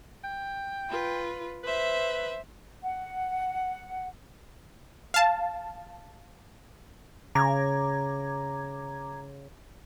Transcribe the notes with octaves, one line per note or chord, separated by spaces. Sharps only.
G5
F4 B4
B4 C5 E5
F#5
F5 A5
C#3 A#5 D6 G#6